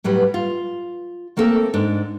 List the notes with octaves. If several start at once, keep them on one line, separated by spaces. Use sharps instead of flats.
A2 F#3 G3 B4
F4
A3 A#3 C4 A4 A#4
G#2 D4